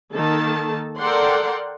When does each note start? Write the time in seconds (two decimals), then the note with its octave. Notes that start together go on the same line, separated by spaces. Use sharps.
0.13 D#3 A#3 D#4 A4 A5
0.98 A4 A#4 D5 F#5 G5 C6